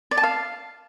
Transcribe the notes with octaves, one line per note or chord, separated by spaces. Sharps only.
D5
A5
F5